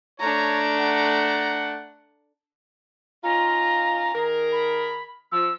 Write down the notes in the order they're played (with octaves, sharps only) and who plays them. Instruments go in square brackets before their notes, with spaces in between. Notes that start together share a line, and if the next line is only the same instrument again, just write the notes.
[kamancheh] A3 D4 [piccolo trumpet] C#5 [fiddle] A#5
[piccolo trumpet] F#5
[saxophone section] C#4 D#4 F4 [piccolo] A#5
[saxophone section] D#3 G#4 A#4
[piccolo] B5
[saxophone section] F3 [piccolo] E6